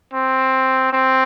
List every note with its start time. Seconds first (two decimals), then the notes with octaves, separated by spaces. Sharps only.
0.13 C4
0.93 C4